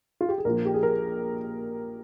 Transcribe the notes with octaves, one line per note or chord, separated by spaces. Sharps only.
F4
G4
G#4
A#1 A#2 F3 A#3 A#4
G4
G#4
A#4